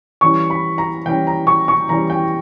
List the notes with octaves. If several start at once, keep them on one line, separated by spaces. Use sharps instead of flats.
E3 G3 C#4 C#6
B5
A#5
E3 G3 C#4 G5
A#5
C#6
C#6
E3 G3 C#4 A#5
G5